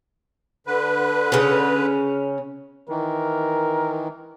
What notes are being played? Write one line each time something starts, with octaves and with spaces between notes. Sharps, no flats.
D3 B4
C#3 C#4
D#3 E3 A#4